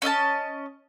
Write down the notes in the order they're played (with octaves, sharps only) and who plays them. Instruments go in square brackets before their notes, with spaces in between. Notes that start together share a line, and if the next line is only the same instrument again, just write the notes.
[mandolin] C#4 D#5 E5 A5